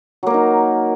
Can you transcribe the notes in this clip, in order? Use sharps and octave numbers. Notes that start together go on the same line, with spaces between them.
F#3 A#3 D#4 A#4